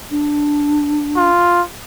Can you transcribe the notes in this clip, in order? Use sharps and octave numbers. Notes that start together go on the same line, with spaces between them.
D4
F4